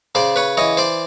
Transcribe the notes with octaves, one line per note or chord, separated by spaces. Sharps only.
C#3 C5 D5
B4 C#5
E3 C#5 D#5
C5 D5